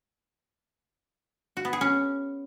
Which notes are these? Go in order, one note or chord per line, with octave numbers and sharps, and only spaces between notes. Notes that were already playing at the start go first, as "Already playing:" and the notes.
F#4
B3
G#4
C#4